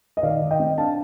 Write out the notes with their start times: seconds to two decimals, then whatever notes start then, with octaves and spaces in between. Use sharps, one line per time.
0.17 D#5
0.23 D#3 D5 F5
0.41 D#3
0.51 D#5 G5
0.60 C4
0.78 D4 F5 A5